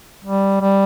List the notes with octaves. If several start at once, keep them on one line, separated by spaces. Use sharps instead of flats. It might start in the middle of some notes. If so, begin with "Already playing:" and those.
G3
G3